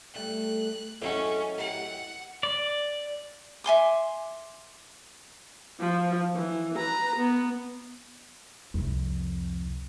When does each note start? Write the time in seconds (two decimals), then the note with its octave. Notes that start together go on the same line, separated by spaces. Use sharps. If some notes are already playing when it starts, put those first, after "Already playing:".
0.15 G3 A3 A4 F#6
1.02 E2 A2 F#3 G#3 C#4 A4
1.58 E4 G4 A#4 F#5
2.43 D5
3.64 E5 G#5 C6 D6
5.80 F3
6.36 E3
6.77 B4 A#5
7.17 B3
8.74 C2 F2